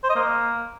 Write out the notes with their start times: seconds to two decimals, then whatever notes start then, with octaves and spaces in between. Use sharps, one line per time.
0.03 C5
0.09 D#5
0.15 A#3